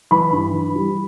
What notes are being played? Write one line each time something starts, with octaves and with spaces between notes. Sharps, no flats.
E3 B5
G2
E3
G3